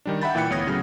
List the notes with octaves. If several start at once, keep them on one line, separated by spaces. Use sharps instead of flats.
D#3 G3 D4
E5 F#5 G5 B5 G6 A6
A#2 E3 E4 G5 F#6 C#7
D2 B3 C#5 D#6 G#6 A#6
A2 C#3 F#3 F6